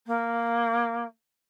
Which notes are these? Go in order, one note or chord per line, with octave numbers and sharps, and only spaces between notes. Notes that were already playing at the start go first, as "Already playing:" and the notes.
A#3